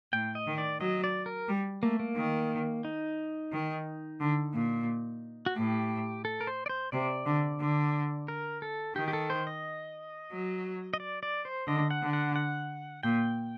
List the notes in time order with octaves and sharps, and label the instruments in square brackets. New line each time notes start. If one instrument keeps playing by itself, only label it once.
[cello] A2 [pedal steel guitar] G5
[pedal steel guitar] D#5
[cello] D#3
[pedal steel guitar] D5
[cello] F#3 [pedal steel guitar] D#5
[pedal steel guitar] D5
A#4
[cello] G3
[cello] A3 [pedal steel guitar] A#3
[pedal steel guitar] A#3
[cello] D#3
[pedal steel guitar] D#4
[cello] D#3
D3
A#2
[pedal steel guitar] F#4
[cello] A2 [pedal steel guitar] G4
[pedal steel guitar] A4
A#4
C5
D5
C5
[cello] C3 [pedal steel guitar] D5
[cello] D3
D3
[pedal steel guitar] A#4
A4
[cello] D#3 [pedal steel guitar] G4
[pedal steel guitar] G4
A4
C5
D#5
[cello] F#3
[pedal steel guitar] D#5
D5
D5
C5
[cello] D3 [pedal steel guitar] D#5
[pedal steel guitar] F#5
[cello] D3
[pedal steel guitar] F#5
F#5
[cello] A#2 [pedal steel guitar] G5